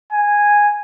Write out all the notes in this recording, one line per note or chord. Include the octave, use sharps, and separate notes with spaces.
G#5